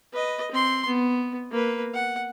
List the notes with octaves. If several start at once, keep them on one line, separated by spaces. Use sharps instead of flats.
B4 D#5
C4 C6
B3
A#3 B4
F#5